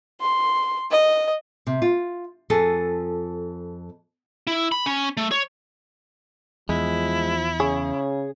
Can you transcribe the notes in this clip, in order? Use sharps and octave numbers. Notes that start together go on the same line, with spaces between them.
C6
D#5
C3
F4
F2 F4 G#4 A4
E4
B5
C#4
A3
C#5
E2 F3 G#3 E4
C#3 G#4 C#5